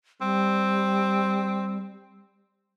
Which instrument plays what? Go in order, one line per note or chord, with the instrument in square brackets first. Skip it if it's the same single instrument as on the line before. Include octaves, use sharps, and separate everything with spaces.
[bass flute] G3 [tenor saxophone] C4